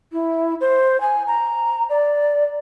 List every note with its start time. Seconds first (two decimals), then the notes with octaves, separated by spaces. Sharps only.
0.12 E4
0.61 C5
1.01 G#5
1.27 A#5
1.90 D5